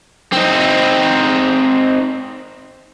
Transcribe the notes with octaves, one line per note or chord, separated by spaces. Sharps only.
C4 D#4